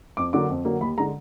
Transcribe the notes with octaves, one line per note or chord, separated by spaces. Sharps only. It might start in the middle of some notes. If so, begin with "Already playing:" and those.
F2 D6
D3 F#3 A#3 D6
F2
D3 F#3 A#3
D#2 B5
D3 G#3 A#5